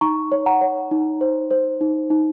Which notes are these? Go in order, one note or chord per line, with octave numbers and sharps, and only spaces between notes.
D#4 A#5 C#6
C#5
F#5 A#5
C#5
D#4
C5
C5
D#4
D#4